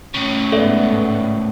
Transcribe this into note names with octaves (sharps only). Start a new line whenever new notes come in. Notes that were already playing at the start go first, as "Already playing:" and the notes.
A2 C#3
G#2 B3 A4 D5 E5